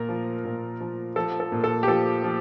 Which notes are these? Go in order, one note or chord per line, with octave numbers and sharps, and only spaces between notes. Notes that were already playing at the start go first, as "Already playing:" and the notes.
Already playing: A#2 A#4
F3
A#2
F3
F3 A4
A4
A#2
A4
G4
F3 A4
F3